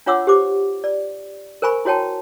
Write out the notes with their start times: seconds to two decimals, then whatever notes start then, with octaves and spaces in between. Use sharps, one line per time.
0.06 D4 F4 C#5 F#5 D6 E6
0.27 G4 C5 D6
0.84 D5
1.62 A#4 C5 G#5 B5 C#6
1.85 E4 F#4 C#5 G5 A5